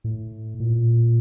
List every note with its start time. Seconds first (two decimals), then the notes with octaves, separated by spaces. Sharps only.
0.04 A2
0.60 A#2